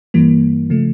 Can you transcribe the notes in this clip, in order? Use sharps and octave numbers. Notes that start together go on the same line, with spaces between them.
G2 E3 G3 A#3
C#3 F3 A3